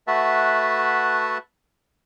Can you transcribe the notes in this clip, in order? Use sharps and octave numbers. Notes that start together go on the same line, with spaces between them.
A3 F#4 B4 E5 F#5 A5